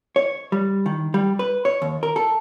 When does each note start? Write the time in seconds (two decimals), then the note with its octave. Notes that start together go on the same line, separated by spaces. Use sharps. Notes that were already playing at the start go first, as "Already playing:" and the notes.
0.16 C#5
0.52 G3
0.86 D#3
1.14 G3
1.39 B4
1.65 C#5
1.82 D#2
2.03 A#4
2.16 A4